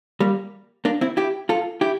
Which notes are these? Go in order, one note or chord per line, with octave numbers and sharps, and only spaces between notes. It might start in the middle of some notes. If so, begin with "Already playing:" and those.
G3 A#3
A#3 D4
C4 E4
E4 G4
F4 A4
E4 G4